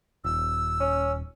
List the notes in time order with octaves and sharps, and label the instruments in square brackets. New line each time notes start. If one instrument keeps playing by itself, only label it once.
[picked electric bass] D#1 [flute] E6
[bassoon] C#4